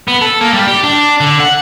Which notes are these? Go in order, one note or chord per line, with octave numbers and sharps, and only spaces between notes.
B3
A4
A#3
G3
G4
D4
D3
F#5